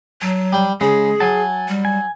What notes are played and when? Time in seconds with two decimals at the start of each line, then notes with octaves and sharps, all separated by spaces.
0.22 F#3 A5
0.53 G3 G5
0.81 C#3 G#3 G#4
1.20 F#3 G#5 A5
1.68 G3
1.85 G#5